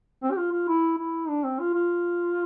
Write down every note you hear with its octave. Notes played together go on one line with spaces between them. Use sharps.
C4
G4
F4
F4
E4
E4
D4
C4
F4
F4